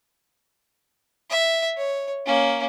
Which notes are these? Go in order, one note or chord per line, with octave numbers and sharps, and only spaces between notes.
E5
C#5
A#3 C#4